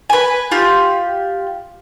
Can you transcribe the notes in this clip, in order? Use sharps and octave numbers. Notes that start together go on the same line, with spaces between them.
B4 G#5
F4 G4